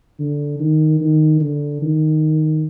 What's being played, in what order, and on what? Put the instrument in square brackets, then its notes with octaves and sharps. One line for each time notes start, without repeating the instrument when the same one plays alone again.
[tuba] D3
D#3
D#3
D3
D#3